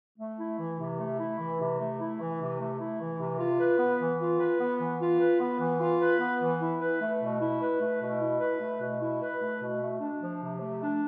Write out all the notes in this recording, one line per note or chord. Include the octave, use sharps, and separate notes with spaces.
A3
E4
E3
C3
A3
E4
E3
C3
A3
E4
E3
C3
A3
E4
E3
C3
F4
B4
B3
E3
F4
B4
B3
E3
F4
B4
B3
E3
F4
B4
B3
E3
E4
B4
A3
B2
E4
B4
A3
B2
E4
B4
A3
B2
E4
B4
A3
B2
A3
D4
F3
C3
A3
D4